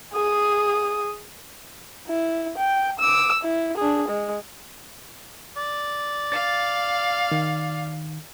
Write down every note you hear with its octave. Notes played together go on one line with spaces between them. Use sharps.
G#4 D#6
E4
G5
D6 E6
E4
D4 G#4
G#3
D5
F5 A6
D#3